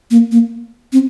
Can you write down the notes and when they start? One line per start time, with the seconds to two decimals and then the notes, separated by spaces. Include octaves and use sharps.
0.11 A#3
0.32 A#3
0.93 C4